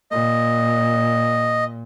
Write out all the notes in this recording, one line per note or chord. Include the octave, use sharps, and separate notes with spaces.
A#2 D#5